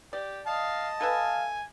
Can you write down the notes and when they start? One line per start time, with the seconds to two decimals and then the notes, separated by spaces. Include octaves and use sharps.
0.13 G4 D5
0.47 D#5 F5 A5
1.01 A4 B4 E5 F5 G#5